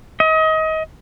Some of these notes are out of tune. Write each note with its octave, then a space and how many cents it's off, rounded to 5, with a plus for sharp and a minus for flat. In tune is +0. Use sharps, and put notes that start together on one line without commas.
D#5 +30